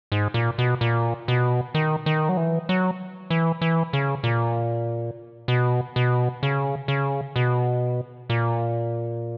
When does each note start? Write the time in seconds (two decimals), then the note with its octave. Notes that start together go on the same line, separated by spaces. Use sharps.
0.12 G#2
0.34 A#2
0.58 B2
0.81 A#2
1.28 B2
1.74 D#3
2.06 D#3
2.29 F#3
2.37 E3
2.69 F#3
3.30 E3
3.61 E3
3.93 C#3
4.24 A#2
5.48 B2
5.96 B2
6.43 C#3
6.88 C#3
7.36 B2
8.30 A#2